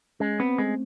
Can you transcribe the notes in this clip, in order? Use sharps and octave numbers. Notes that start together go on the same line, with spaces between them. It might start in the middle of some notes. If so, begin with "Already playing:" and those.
G#3 C#4
B3 C4
G#3 A3